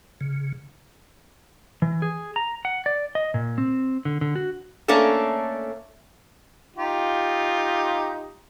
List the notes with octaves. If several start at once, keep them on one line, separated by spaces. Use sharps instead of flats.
C#3
E3
G#4
A#5
F#5
D5
D#5
A#2
C4
D3
D3
F#4
A3 A#3 C#4 D4 A4
D#4 F4 G4